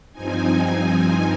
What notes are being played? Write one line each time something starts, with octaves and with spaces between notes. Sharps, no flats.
G2 F3 C4 D#4 G#5